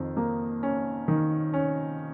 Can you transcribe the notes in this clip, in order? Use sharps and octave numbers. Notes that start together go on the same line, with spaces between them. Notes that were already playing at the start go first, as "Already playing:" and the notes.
Already playing: F2 D#3
A#3
C#4
D#3
C#4